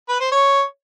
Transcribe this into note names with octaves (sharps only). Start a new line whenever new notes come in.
B4
C5
C#5